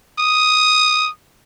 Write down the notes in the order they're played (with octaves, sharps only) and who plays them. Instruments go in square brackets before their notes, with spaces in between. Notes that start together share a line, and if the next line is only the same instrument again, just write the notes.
[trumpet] D#6